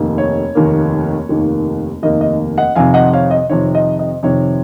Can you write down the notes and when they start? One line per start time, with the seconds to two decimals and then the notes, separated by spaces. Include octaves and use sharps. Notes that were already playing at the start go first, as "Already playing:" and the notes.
Already playing: F1 D#2 D#3 A#3
0.18 C#5
0.55 F1 D#2 D#3 A#3
1.29 F1 D#2 D#3 A#3
2.03 F1 D#2 D#3 A#3 D#5
2.21 D#5
2.58 D#5 F#5
2.75 F2 C3 D#3 F5 G#5
2.94 D#5 F#5
3.13 C#5 F5
3.31 D#5
3.49 F2 C3 D#3 C#5
3.75 D#5
3.99 D#5
4.23 F2 C3 D#3 C#5